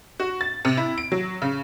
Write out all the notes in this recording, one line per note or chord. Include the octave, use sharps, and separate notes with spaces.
F#4
A6
C3
E4
D7
F#3
C#3